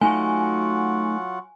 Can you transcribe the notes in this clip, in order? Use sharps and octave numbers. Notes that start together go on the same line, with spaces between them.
F#3 A3 D#4 F4 F#4 F#5 G#5